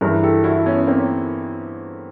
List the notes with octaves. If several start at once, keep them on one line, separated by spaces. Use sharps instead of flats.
G2 E3 G#4 A#4
G4 A4
E4 F#4
B3 C#4
A#3 C4